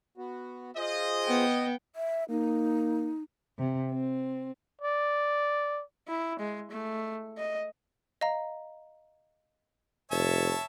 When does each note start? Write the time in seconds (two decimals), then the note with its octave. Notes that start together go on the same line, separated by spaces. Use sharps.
0.18 B3 F#4
0.77 F4 G#4 C5 D#5
1.25 B3 G5
1.96 E5
2.30 A#3 D#4
3.58 C3
3.92 C4
4.81 D5
6.08 E4
6.39 G#3
6.71 A3
7.38 D#5
8.21 D#5 F5 A#5
10.11 F1 C#5 E5 A5